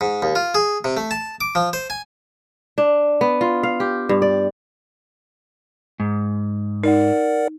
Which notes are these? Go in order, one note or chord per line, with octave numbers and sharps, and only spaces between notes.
G#2
D#2
F4
G#4
C3
A3
A5
D6
F3
C5
G#5
D4
B3
F4
F5
G4
G2
D5
G#2
D#4 A#4 D5 F#5